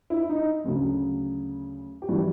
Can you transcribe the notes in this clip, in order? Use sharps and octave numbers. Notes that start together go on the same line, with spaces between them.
E4
D#4
D2 C#3 F#3
G4
E3 G3 F#4